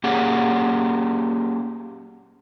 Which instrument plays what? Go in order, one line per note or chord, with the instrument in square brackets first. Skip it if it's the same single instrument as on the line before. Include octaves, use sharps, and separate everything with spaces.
[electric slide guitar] A#3 C#4 G4 G#4 F#5